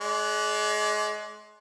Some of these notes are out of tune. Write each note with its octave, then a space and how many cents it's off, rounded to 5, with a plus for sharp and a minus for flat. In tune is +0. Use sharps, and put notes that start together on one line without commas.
G#3 +30 D5 -20